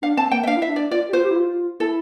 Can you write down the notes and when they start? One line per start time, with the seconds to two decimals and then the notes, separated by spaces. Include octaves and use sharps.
0.02 D4 F5
0.17 C4 A5
0.31 A#3 G5
0.43 E5
0.47 D4 F5
0.57 E4 E5
0.68 D4
0.76 D5
0.91 F4 D5
1.09 G4
1.13 F4 C5
1.24 G4
1.31 E4
1.36 F4
1.80 E4 A4